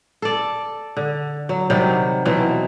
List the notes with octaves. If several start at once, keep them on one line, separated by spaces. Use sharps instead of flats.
A4 D5
D3
F#3
C3 D#3 F#3 G3
B2 E3 F#3 C4